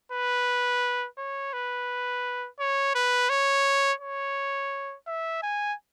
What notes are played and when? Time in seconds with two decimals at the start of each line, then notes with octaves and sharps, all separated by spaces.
0.12 B4
1.18 C#5
1.53 B4
2.59 C#5
2.95 B4
3.30 C#5
4.01 C#5
5.07 E5
5.43 G#5